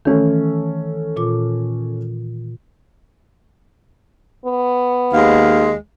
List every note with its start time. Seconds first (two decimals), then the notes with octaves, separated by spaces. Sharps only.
0.05 D#3 E3 A3 C#4 A4
1.16 A#2 F4 D6
4.46 B3
5.13 D#2 G#3 F5